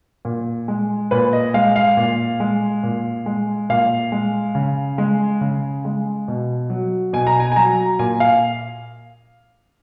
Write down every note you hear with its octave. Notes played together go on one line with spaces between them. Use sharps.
A#2
G#3
A#2 B4
D#5
G#3 F5
F5
A#2
G#3
A#2
G#3
A#2 F5
G#3
C#3
G#3
C#3
G#3
B2
F#3
B2 G#5
A#5
G#5
G#5
F#3 A#5
A#2 G#5
F5